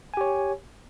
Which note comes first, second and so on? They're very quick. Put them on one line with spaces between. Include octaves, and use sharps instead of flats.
G#5 G4 C#5